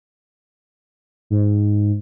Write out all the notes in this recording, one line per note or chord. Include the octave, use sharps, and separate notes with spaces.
G#2